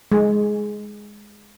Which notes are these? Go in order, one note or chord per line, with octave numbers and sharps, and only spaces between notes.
G#3